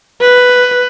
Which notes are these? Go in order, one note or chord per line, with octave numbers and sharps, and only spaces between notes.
B4